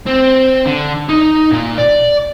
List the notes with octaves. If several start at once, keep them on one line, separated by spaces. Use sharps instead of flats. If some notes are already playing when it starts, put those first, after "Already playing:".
C4
D3
D#4
A#2 F5
D5